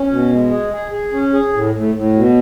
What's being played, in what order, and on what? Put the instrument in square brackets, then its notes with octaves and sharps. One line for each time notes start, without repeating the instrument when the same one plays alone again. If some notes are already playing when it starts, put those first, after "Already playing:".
Already playing: [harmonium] C#4
B2
G#3
G#4
G#4
G#4
C#4
G#4
A2
A2
A2
B2